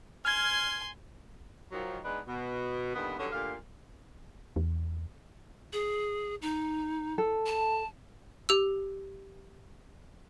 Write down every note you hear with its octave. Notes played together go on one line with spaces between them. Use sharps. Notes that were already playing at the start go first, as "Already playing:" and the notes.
G#5 C6 F6 G#6
D#3 F3 F#3
G#3 B3 D4 D#4 B4
B2
G2 A#2 D3 D#3 B3
D3 E3 F#3 G3 B3 C#4
A#2 D3 A3 G4 F5
E2
G#4
D#4
A4
A5
G4 E6